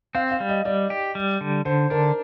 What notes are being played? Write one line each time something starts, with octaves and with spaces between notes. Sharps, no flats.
C4 F5
F5
G3
D#5
G3 D5
G4
G3
D3
D3 C5
D4 A#4